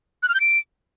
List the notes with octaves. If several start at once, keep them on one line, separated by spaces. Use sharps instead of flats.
F#6
F6
G6
D7